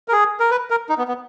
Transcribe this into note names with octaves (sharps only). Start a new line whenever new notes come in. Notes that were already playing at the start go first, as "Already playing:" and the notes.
A#4
G#4
A#4
B4
A#4
D#4
B3
B3